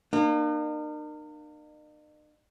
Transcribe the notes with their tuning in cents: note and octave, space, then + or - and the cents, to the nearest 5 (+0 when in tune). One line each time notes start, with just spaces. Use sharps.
A#3 +0 D#4 -45